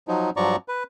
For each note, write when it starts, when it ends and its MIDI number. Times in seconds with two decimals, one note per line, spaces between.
0.08 0.30 53
0.08 0.30 54
0.08 0.30 63
0.37 0.56 43
0.37 0.56 53
0.37 0.56 54
0.37 0.56 74
0.37 0.56 82
0.37 0.56 85
0.68 0.83 71